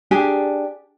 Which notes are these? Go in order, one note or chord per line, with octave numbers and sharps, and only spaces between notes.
D4 G4 G#4 G#5